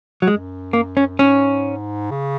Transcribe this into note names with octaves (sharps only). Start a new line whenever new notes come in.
F#3
F#2 G#3
A#3
C#4
G#2 C#4
C#3